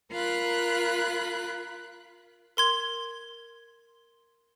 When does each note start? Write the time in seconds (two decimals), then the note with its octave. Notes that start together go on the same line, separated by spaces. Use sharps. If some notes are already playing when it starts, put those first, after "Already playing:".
0.12 F4 A#4 B5 F#6
2.57 A#4 C6 G#6